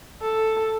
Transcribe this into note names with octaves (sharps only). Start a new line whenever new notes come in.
A4